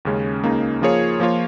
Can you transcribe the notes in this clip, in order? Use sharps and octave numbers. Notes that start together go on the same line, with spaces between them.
D#2 C#3 G#3 C#4
C#2 C#3 A#3 D#4
F3 A#3 F4 G#4 C#5
F3 A#3 F4 C#5